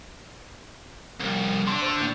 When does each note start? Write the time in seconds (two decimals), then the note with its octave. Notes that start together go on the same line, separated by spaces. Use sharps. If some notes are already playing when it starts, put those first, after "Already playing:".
1.20 C2 F2
1.67 D3 D4 C6
1.82 C5 C6 E6
1.97 A2 G6